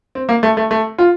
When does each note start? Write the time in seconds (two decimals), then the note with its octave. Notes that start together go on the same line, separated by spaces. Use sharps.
0.15 C4
0.29 A#3
0.43 A3
0.57 A3
0.71 A3
0.98 F4